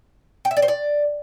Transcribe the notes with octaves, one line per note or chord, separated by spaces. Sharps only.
G5
E5
D5
C5
D5